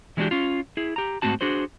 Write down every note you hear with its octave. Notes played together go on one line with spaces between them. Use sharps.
E3 G#3 C#4 D4 F#4 G4
C#4 F4
E4 G#4
G4 A#5
G#2 C3 A3 C4 F#4 A5
D4 F#4 G#4 C5